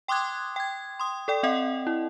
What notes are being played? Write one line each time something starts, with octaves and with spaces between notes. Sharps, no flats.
G5 C6 D6 D#6 F#6 G#6
G5 G#6
C6 D#6
A4 D5 G5
C4 D#5 F#5
E4